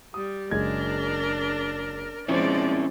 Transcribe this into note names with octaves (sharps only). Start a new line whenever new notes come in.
G3 D#6
F#1 G#3 D4 A#4 G#6
F3 G#3 C4 C#4 E4 C5 D5